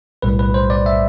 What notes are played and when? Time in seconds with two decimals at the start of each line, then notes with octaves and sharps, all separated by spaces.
0.22 B1 A2 G3 B4
0.39 B4
0.54 C5
0.70 D5
0.86 E5